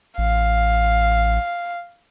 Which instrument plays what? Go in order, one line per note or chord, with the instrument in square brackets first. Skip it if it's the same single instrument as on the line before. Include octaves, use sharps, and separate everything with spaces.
[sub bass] A1 [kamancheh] F5